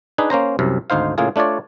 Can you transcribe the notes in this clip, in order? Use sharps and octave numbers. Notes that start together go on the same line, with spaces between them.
D4 D#4 G#4 B4
A#3 C#4 C5 A#5
C2 F#2 C3
G#1 D2 D#4 C5 F5
A2 C#3 A#3 F4 G#4
A3 D4 F4 C#5 D5